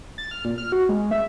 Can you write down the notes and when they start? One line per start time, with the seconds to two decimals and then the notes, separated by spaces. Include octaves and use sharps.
0.18 A6
0.31 F6
0.45 A#2
0.58 F6
0.72 F#4
0.89 G#3
1.11 E5